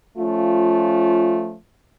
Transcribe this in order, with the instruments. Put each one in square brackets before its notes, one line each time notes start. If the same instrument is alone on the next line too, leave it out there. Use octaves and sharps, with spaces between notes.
[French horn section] F3 A3 C#4 F4